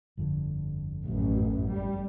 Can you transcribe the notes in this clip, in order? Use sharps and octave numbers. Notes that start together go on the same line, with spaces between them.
G1 F2 D3
A1 F#2
G3